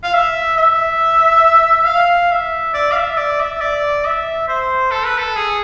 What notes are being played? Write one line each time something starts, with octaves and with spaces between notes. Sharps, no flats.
F5
E5
E5
F5
E5
D5
F5
E5
D5
E5
D5
E5
C5
A4
B4
A4
G#4